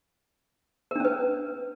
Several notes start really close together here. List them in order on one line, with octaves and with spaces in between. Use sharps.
A#4 D4 C#4 B4